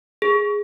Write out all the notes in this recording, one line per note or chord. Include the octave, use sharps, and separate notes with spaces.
G#4